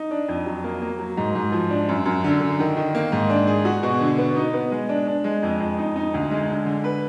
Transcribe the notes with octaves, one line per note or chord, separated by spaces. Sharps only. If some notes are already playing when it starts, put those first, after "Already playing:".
Already playing: D#4
D4
F2
F#3
A#3
A#3
F#3
G#2
G#2
F3
D4
F#2
F#2
D3
D3
D#3
D#3
A#3
G#2
D4
G#4
F#4
B2
D3
B3
D#4
B3
G#3
D4
D4
G#3
F2
F2
D#4
D#4
D2
G#3
D3
D3
B4